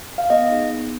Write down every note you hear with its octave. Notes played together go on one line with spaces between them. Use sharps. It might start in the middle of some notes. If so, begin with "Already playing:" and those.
F5
B3 D#5
D#4 G#4
B3